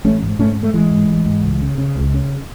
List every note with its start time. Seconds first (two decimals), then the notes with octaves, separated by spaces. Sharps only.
0.04 A1 A3 C#4
0.23 G#2
0.39 G#2 A3 C#4
0.56 G#2
0.63 A3
0.74 A1 E3 G#3
0.91 G#2
1.09 A1
1.26 G#2
1.43 C#2
1.62 C#3
1.78 C#3
1.96 C#2
2.14 C#3